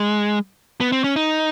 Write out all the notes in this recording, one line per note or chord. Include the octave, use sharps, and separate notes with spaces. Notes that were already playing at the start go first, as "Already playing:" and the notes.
Already playing: G#3
B3
C4
C#4
D#4